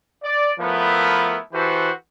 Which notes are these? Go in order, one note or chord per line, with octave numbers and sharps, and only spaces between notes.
D5
F3 A3 B3 E4 A#4 B4
E3 F#4 G4 A4 B4 C5